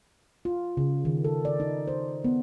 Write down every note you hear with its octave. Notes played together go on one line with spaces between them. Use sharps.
F4
C#3
D#3
A4
D5
D#4
C5
B3